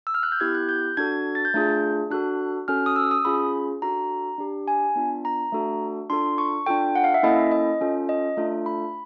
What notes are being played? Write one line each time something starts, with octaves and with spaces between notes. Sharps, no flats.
E6
F6
F#6
G6
B3 E4 G4 G#6
F#6
G6
D4 F#4 A4 G#6
A6
G6
A3 D4 F4 G#4
D4 F#4 A4 F#6
C#4 F#4 A4 F6
D#6
E6
D#6
C#4 F4 G#4 B5
D4 F#4 A4 A#5
D4 G4
G#5
B3 D4 F4
A#5
A3 D4 F#4 A4
D4 F4 A4 C6
C#6
D4 F4 A4 G5
F#5
F5
E5
A#3 C#4 E4 A4 D#5
D#5
C#4 F4 A4
D#5
A3 D4 F4 A4
B5